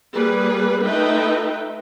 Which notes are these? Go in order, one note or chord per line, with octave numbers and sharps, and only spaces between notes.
G3 A#3 G#4 B4
A3 D#4 F4 B4 E5 G5